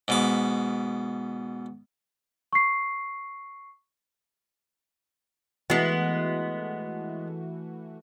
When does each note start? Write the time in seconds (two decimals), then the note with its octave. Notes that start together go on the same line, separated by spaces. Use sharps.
0.08 G#2 B2 D6
2.53 C#6 C7
5.70 E3 G#3 A3 B3 F#4